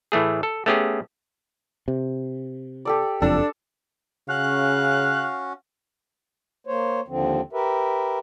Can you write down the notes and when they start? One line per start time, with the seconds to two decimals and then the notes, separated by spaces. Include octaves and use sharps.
0.12 A2 E3 A3 G#4
0.43 A4
0.66 A3 B3 C#4 G4 G#4
1.88 C3
2.85 G4 A4 D5
3.22 F#1 F2 D4 A4 A5
4.29 C#3 C#4 F#4 F5 F#6
6.67 A#3 C5 C#5
7.08 D#2 D3 F3 C4
7.53 G4 A#4 B4 E5